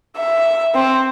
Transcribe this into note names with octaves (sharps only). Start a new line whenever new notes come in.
E5
C4